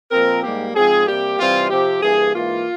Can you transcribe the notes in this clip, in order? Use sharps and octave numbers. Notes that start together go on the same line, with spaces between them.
A#2 F3 C4 A#4
G#2 G3 A#3 G4
G#2 F3 C4 G#4
C3 G3 A#3 G4
C3 E3 G3 C4 F4
C3 F3 C4 G4
G2 E3 A#3 G#4
G#2 E3 A#3 F4